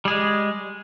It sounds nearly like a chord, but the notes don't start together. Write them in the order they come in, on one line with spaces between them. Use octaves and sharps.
G3 G#4 G#3